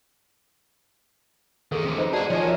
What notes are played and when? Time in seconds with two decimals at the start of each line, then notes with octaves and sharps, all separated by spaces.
1.72 E2 D#3 G#4 A4
1.84 F2 C3
1.98 D#4 B4 C5
2.13 F#4 G#4 D5 F#5 A5
2.30 F3 C#5 D#5 G#5
2.43 A#4 E5